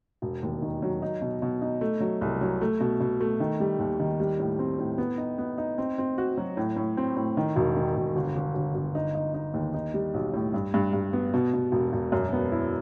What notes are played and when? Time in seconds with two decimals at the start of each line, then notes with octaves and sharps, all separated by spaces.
0.22 E1
0.43 D#2
0.62 D#3
0.82 F#3
1.02 D#4
1.22 B2
1.42 B2
1.62 D#4
1.81 A3
2.01 F#3
2.21 C2
2.41 F#3
2.61 A3
2.80 B2
3.00 B2
3.21 A3
3.40 D#3
3.60 G3
3.79 D#2
4.00 D#3
4.20 G3
4.39 A2
4.59 C4
4.78 A2
4.98 B3
5.18 D#4
5.38 B3
5.58 D#4
5.78 C4
5.98 C4
6.18 F#4
6.38 F#3
6.57 A2
6.76 A2
6.97 C4
7.17 A2
7.37 D#3
7.56 E1
7.76 D#3
7.96 E1
8.16 G1
8.36 G1
8.55 G1
8.75 G1
8.95 D#4
9.15 D#4
9.34 D#4
9.54 D#2
9.74 D#4
9.94 G3
10.14 B1
10.33 A2
10.54 G2
10.74 G2
10.93 G2
11.13 B3
11.34 B2
11.53 B2
11.72 E1
11.93 E1
12.12 F#2
12.32 B3
12.52 E4